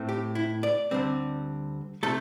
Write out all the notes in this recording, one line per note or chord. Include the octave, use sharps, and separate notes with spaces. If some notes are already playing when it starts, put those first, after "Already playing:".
Already playing: A2 A3 C4
G4
E4
D5
D2 D3 G3 C4
C3 A3 A4